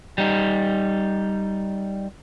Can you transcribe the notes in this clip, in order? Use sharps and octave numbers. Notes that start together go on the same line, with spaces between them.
G3 D#4